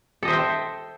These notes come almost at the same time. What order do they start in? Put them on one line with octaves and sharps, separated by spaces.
A4 D#5 C5 E5 G5